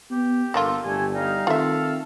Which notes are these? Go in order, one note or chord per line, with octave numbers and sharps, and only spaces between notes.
B3 G4
G1 A#3 D4 F4 A4
G1 G3 A3 G4 G#5
G3 D#4 F5
D#3 A3 C4 F4 A4 E5